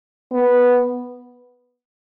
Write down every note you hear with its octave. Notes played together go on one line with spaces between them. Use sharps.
B3